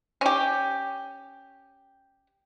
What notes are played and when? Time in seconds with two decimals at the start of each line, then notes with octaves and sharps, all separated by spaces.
0.21 C#4 G4